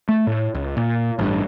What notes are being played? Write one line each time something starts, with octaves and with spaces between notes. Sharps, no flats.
A3
A2
C#2
A#2
A1 G2